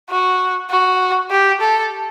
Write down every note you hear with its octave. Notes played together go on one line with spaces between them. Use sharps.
F#4
F#4
G4
A4